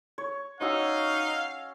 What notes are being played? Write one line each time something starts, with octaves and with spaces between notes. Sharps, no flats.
C#5
C#4 D#4 F#4 F5 E6